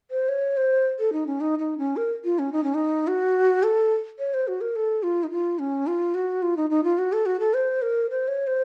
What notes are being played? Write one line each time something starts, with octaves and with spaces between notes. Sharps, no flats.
C5
C#5
C5
A4
D#4
C#4
D#4
D#4
C#4
A#4
F4
C#4
D#4
C#4
D#4
F#4
A4
C#5
C5
F#4
A#4
A4
F4
D#4
F4
C#4
F4
F#4
F4
D#4
D#4
F4
F#4
A4
F#4
A4
C5
A#4
C5
C#5
C5